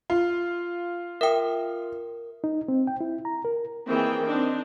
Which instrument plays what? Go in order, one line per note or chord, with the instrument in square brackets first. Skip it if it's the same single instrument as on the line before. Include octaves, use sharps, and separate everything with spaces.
[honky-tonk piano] F4
[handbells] A#4 D#6 [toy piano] E5 G5
[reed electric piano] D#4
C4
G5
E4
A#5
A#4
[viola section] D#3 E3 A#3 C4 G#4 G5
C4 D4 D#4